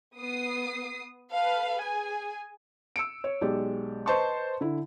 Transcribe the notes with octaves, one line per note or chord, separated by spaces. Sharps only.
B3 D#6 C7
A4 B4 F5
G#4 G#5
E6 C#7 D7
C#5
B1 G#3 G4 D5
B4 C5 D#5 A5 C6 C#6
D3 E4